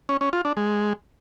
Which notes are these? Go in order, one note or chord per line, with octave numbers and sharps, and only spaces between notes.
C#4
C#4
F4
D4
G#3